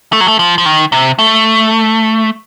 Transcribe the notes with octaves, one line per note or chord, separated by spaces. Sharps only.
A3
F#3
A3
F3
F3
D#3
C3
A3